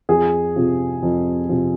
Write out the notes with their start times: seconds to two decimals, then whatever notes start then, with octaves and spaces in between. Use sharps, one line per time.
0.09 F2 G#4
0.56 C3 F3
1.03 F2
1.49 C3 F3